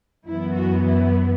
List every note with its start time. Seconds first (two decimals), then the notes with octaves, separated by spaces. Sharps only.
0.27 F#2 E3 B3 E4
0.55 F#4
0.83 E4